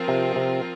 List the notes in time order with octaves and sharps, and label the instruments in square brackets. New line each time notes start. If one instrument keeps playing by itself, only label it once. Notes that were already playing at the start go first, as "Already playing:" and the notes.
Already playing: [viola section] F3 C4 F4 A#4
[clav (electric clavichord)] C3
C3